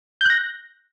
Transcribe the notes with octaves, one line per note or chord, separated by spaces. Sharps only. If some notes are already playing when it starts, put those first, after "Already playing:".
F#6 G6 A#6